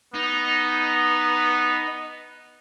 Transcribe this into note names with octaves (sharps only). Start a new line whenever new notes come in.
B3 D#4